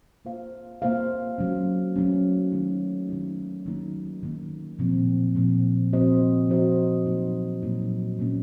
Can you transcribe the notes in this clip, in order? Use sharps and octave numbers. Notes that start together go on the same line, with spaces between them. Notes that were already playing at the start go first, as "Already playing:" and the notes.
A#3 F4 C5 F5
A#3 F4 C5 F5
F#3 A3 C#4
F#3 A3 C#4
D#3 A3 D#4
D#3 A3 D#4
D#3 F#3 A#3 D#4
D#3 F#3 A#3 D#4
A#2 F3 C4
A#2 F3 C4
F3 C4 F#4 C5 D#5
F3 C4 F#4 C5 D#5
A#2 F#3 A#3 D#4
A#2 F#3 A#3 D#4
A#2 F3 A#3 C#4